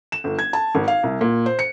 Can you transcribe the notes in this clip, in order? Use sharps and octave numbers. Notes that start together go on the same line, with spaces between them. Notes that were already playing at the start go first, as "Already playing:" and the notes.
E7
G1
G#6
A5
G#1
F5
C2
A#2
C5
C#7